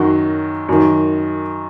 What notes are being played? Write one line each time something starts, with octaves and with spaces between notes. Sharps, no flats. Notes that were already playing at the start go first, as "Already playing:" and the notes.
Already playing: F#2 D#3 F#3 F#4
F#2 D#3